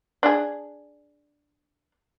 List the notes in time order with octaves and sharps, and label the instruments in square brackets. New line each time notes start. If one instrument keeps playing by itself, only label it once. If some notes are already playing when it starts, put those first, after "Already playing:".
[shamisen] D4 G#4